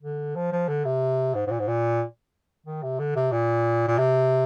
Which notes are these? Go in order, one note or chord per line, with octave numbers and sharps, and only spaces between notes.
D3
F3
F3
D3
C3
G#2
G#2
A#2
G#2
A#2
D#3
C3
D3
C3
A#2
A#2
C3